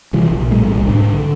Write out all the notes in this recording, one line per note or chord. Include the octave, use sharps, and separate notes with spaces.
C3 E3 F3 G3
A#1
A2 G3 A3
D1 B1 G3
G#2 D4
D3